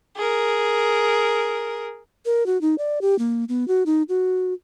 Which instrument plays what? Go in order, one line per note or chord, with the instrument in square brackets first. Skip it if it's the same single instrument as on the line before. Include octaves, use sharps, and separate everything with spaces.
[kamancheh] G#4 A#4
[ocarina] A#4
F#4
D#4
D5
G4
A#3
B3
F#4
D#4
F#4